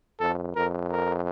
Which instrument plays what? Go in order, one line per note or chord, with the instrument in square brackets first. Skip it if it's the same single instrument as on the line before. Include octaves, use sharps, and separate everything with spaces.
[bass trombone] F2 [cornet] A4
[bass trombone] F2 [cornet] A#4
[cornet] A#4